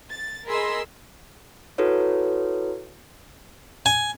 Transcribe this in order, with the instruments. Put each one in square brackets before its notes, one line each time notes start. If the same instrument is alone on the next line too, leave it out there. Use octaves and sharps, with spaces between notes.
[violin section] A6
G#4 A#4 D#5 B5 C6 E6
[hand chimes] E4 F#4 A4 B4 C#5
[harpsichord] G#5